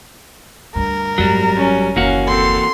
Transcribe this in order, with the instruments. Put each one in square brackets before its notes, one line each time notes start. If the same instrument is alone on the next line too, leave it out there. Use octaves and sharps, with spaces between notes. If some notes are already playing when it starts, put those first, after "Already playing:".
[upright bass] D2 G2 [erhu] A#4
[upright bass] G#1 F#2 [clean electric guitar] F#3 G3
[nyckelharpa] C#4
[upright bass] F#1 D#2 [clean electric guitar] E3 A#3 F#4 [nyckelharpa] C#4 F5
[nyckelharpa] C4 A4 [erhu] C6